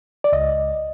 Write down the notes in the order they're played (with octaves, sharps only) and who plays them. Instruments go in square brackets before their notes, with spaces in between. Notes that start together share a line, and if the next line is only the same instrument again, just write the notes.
[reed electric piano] D5
C#2 D#5